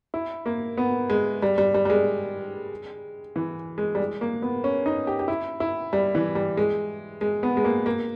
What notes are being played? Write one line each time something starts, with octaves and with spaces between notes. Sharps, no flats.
E4
A#3
B3
G#3
G3
G3
G3
G3
G#3
E3
G#3
G3
G#3
A#3
B3
C#4
D#4
G4
G4
E4
E4
G3
E3
G3
G#3
G#3
B3
G#3
A#3
A#3